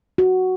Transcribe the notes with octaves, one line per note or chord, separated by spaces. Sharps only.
F#4